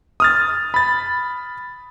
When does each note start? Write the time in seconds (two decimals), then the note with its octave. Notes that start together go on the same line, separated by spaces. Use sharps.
0.20 D#6 F6 A6
0.74 B5 A6